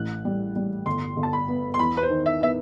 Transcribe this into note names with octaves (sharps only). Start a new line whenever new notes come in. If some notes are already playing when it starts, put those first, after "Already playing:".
Already playing: A1 F#6
G3
G3
G1 C6
G1
A5
B5
B3
C6
E2 B5
B4
C5
D#3
E5
B3 E5